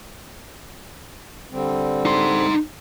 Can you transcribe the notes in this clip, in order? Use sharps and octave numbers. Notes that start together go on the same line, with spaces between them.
D3 G3 C4
D#4 C6